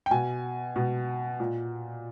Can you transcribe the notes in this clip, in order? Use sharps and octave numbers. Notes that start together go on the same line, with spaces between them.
G5
B2 G#5
B2
A#2